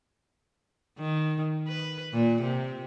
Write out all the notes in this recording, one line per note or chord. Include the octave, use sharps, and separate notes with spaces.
D#3
B4
A#2
C3